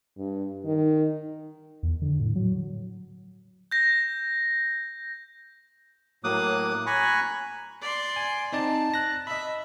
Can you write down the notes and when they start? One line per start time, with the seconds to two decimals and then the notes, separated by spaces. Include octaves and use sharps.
0.17 G2
0.65 D#3
1.83 E2
2.02 D3
2.20 A2
2.35 F#3
3.71 G6 A#6
6.24 A2 F#3 A#3 D6 D#6 F#6
6.86 G#5 A#5 B5 C#6 F#6
7.82 D5 C6
8.16 G#5
8.53 C4 D#4 D5 A5
8.94 F#6 A#6
9.27 D#5 E5 B5